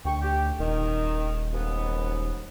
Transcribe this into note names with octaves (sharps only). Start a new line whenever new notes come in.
D2 G5 C#6
G4
D#1 D#3
D#2 G#2 B3